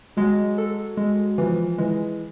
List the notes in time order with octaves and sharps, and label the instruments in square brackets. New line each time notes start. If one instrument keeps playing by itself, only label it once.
[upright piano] F#3 [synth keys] G#3
[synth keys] A4
G#3
[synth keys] E3 [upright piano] F3
[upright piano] E3 [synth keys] G#3